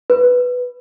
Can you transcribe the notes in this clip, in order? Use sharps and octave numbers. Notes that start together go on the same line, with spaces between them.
B4